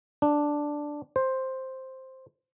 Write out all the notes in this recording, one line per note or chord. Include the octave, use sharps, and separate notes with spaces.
D4
C5